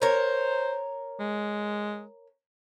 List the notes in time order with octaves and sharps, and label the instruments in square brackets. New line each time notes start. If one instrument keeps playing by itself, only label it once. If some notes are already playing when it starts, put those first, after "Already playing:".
[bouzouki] A#4 C#5 [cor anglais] C5
[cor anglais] G#3